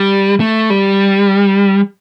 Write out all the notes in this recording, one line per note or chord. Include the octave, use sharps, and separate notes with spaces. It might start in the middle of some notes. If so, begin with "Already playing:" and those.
Already playing: G3
A3
G3